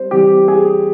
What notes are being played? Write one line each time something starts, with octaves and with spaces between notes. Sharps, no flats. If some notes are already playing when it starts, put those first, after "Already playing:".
Already playing: G3 C4 C5
E3 G3 C4 G4
G#4